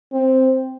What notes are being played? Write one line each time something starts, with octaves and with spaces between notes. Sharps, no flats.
C4